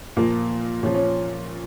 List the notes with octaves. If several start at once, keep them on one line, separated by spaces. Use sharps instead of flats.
A#2 F3 A#3
A#2 F3 C#4
C#4